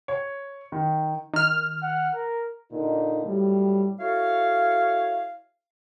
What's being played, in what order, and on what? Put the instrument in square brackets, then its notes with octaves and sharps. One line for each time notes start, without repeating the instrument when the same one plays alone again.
[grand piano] C#5
D#3
[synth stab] D#3 F6
[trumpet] F#5
A#4
[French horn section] A#2 D3 D#4
A2 F#3 G3
[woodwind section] E4 F#4 A4 C#5 F5